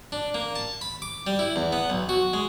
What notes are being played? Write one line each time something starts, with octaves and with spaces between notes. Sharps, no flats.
D4
A#3
A5
B5
D6
G3
E4
E2
B3
B1
F#4
G#3